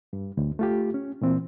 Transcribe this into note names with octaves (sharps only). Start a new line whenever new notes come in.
G2
D2
A3 F4 G4
C#4
A#2 E3 C4